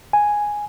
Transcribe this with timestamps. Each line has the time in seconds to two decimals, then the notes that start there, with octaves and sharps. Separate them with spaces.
0.13 G#5